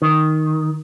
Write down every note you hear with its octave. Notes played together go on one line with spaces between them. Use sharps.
D#3